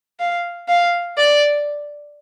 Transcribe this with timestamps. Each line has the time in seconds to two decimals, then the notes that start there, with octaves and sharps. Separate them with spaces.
0.20 F5
0.68 F5
1.17 D5